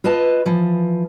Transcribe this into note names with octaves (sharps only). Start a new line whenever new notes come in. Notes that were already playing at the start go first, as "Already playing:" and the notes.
F4 B4 D#5 A5
E3 F3